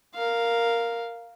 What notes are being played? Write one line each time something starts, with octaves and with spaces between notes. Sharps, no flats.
A#4 F5